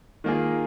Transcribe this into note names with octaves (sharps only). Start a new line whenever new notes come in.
D#3 A#3 F4 G#4